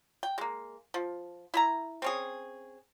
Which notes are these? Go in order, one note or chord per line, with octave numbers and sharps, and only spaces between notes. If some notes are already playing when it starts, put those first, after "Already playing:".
G5
G#3 A#3
F3
E4 E5 A#5
C4 C#4 G#4